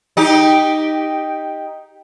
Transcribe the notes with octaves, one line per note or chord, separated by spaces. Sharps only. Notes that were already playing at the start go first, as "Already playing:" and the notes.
D#4 G4